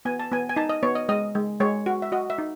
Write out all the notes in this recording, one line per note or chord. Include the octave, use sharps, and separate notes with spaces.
B3 G#5
A5
B3 G#5
G#5
D#4 A5
D#5
B3 C#5
D#5
G#3 D#5
G#3
G#3 C#5
F#4
E5
F#4 D#5
E5
D#4